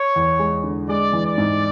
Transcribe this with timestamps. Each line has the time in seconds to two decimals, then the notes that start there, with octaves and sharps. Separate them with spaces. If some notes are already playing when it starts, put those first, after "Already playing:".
Already playing: C#5
0.16 E2
0.39 G#3
0.64 D3
0.89 G#3 D5
1.13 E3
1.25 D5
1.38 G#2